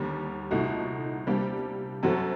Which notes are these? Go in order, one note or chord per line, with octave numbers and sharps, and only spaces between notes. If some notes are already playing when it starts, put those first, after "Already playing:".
Already playing: D#2 D3 G3
C2 A#2 A3 D#4 F#4
C3 G3 A#3 D4 G4
F#2 F#3 C4 F#4 A4